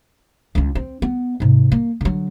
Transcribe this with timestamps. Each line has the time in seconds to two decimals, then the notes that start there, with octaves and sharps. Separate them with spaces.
0.55 C#2 F4
0.75 C4
1.02 B3
1.40 G#2 C3
1.72 A#3
2.01 D3 F#3